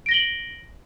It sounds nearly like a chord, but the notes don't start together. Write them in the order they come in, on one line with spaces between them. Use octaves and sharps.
D7 A#6 G7 F#7